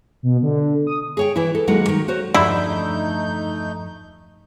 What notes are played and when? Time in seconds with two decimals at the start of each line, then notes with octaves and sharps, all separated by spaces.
0.23 B2
0.43 D3
0.87 D#6
1.17 G#4 C#5 G5
1.36 E3 E4
1.55 A4
1.67 D#2 F#3 G#3 A4 F#5
1.88 D#3 F#3
2.08 F#4 C5 C#5
2.34 E2 G2 D3 F3 A3 D#4 E4 G6